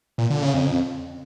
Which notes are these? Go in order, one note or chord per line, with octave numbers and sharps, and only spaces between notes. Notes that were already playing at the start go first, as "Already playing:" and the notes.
A#2
D3
C#3
F2